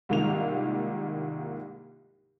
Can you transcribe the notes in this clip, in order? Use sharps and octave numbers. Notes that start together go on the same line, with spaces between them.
C2 G#2 D#3 A#3 F4 F7